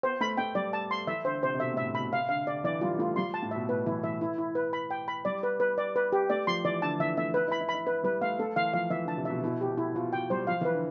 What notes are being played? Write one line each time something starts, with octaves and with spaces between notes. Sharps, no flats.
B3 C5
A3 B5
A3 G5
G3 D5
A5
C6
E3 E5
D3 C5
C3 C5
C3
B2 E5
A2
E5
A2
B2 B5
C3 F5
D3 F5
D3 D5
E3 D5
G3 F4
A3 F4
G3 C6
A5
A2
B2 E5
A2 B4
E3 E4
E3 E5
E4
E4
B4
B5
G5
B5
G3 D5
B4
B4
D5
B4
G4
A3 D5
F3 C6
E3 D5
D3 A5
E3 E5
A3 E5
E4 B4
E4
B5
E4
B5
E4
E4 B4
G3 B4
A3 F5
A3 A4
E3 F5
F3 F5
E3 E5
D3
A5
C3
B2 E5
B2 E4
G4
B2
E4
B2 F4
B2 G5
G3 C5
F3 F5
E3
B4
D3